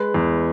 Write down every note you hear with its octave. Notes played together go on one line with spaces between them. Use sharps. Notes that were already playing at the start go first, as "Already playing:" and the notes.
Already playing: G#3 B4
E2